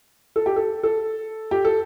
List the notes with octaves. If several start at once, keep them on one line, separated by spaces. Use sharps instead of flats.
A4
G4
A4
A4
G4
A4